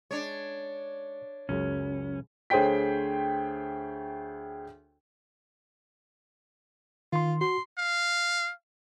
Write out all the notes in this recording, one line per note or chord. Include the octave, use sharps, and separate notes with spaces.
G#3 D4 C#5
C#2 F#2 C#3 C#4
D2 G#4 C5 C#5 G5 B6
D#3 F4 C6
F#4 C6
F5